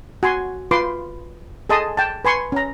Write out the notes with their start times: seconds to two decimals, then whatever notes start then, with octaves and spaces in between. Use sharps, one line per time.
0.23 F#4 G#5 C6
0.71 F4 B4 C6 D6
1.69 G#4 A4 D#5 A5 C6 D#6
1.97 G5 A5
2.25 B4 G#5 C6 C#6
2.52 C#4 A#5